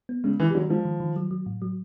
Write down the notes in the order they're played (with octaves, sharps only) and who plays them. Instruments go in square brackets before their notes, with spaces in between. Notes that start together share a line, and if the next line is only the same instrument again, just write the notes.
[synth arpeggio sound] B3
[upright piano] C#3 [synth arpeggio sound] G#3
[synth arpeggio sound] D#3 [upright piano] E3
[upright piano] G3
[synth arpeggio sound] D#3 [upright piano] F#3
[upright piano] F3 [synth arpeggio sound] G#3
[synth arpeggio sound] D#3
D#3
F#3
F#3
A2
F#3